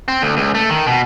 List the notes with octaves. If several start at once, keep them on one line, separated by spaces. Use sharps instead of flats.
C4
D2
C#2
A3
D#3
B2